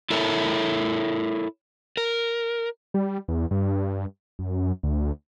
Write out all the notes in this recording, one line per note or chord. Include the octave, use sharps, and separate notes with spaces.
E4 A4 A#4 C#5 E5
A#4
G3
E2
G2
F#2
D2